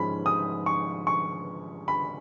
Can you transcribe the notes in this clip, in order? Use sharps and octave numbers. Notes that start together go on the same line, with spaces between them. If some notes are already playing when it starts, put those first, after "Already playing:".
Already playing: G#2 F3 G#3 C#4 B5
D#6
C#6
C#6
B5